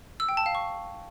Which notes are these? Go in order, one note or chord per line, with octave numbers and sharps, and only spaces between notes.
E6
G5
A5
F5
C#6